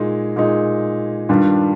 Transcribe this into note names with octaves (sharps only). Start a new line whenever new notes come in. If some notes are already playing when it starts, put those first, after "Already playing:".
Already playing: A#2 G#3 D#4
A#2 G#3 D#4
G2 D#3 G3 D4 F4